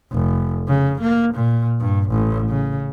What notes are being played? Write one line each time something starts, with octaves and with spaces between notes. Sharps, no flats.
F1
C#3
A#3
A#2
G2
A1
C#3